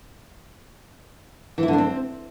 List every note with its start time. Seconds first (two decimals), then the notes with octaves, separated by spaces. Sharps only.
1.58 E3
1.63 E4
1.68 D3
1.73 D4
1.78 C4